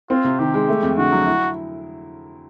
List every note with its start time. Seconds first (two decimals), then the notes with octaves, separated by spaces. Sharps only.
0.10 C4 F4
0.24 C3
0.39 D#3 G4
0.54 G#3
0.68 A3
0.83 F2
0.97 D3 F#4
1.12 F#3
1.26 E4